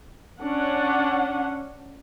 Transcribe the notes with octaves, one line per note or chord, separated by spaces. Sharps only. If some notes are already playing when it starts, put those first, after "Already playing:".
C#4 D4 F#5